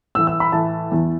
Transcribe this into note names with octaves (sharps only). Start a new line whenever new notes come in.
A2 E3 E6
E6
B5
A2 E3 A5
E2 E3